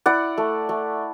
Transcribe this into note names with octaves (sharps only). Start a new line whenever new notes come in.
E4 D5 F#5
A3
A3